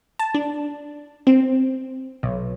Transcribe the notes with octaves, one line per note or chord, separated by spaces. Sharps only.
A5
D4
C4
B1